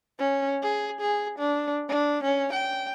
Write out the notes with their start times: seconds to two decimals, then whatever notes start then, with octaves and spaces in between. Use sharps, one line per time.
0.19 C#4
0.63 G#4
1.01 G#4
1.39 D4
1.89 D4
2.23 C#4
2.53 G5